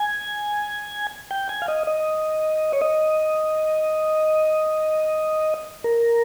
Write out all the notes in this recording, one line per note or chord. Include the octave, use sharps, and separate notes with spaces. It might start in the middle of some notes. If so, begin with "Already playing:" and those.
Already playing: G#5
G5
G#5
F5
D#5
D#5
C#5
D#5
A#4